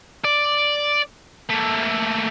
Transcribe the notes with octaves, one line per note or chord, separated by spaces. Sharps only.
D5
A3 A#3